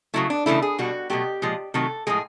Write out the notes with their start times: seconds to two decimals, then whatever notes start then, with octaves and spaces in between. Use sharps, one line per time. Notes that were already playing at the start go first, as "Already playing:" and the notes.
0.14 C#3 F#3 A3 E4
0.30 D4
0.46 C#3 E3 A3 E4
0.62 G#4
0.78 B2 G3 F#4
1.10 B2 F#3 A3 G4
1.42 A#2 F3 G#3
1.74 C3 D#3 F#3 A3 A4
2.07 A2 F3 G#3 G#4